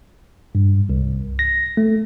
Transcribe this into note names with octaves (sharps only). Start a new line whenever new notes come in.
G2
C2
A#6
A3